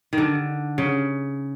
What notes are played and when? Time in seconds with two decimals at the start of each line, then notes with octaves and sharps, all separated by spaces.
0.13 D#3
0.18 D3
0.78 C#3